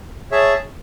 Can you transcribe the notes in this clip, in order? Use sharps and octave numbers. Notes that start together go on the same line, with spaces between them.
G#4 C#5 E5 A5